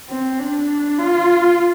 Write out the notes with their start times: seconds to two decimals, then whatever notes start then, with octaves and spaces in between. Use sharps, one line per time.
0.09 C4
0.39 D4
0.98 F4